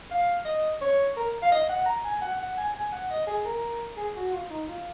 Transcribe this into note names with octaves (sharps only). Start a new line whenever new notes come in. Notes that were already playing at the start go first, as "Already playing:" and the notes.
F5
D#5
C#5
A#4
F5
D#5
F#5
A#5
G#5
F#5
F#5
G#5
G#5
F#5
D#5
G#4
A#4
G#4
F#4
F4
D#4
F4